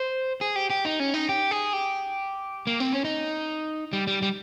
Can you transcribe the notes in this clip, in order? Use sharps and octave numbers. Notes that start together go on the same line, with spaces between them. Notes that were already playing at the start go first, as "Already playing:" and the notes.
Already playing: C5
G#4
G4
G4
D#4
C#4
D#4
G4
G#4
G4
A#3
C4
C#4
D#4
G3
G3
G3